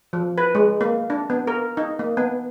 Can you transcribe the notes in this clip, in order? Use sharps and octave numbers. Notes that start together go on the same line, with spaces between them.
F3
B4
G#3
A#3
D4
B3
A#4
D#4
A#3
B3